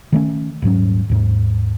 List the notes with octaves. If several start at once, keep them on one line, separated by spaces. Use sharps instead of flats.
D#3 A3 C#4
D#1 G#2 F#3 C#4
D#2 G#2